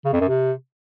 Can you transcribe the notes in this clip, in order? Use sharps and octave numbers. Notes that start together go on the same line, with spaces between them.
C#3
F2
F#2
C3